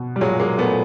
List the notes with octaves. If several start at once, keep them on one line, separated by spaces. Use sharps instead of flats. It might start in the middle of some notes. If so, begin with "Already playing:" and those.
Already playing: B2
G3
A#2 F#3 G#3
G#3 A#3
A#2 A3 B3